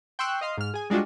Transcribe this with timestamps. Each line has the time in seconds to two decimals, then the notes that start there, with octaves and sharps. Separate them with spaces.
0.19 G5 C6 C#6 E6 F#6
0.41 D#5 F5 C6
0.58 G#2 F6
0.74 G#4 G#5
0.90 G3 G#3 D4 F4 F#4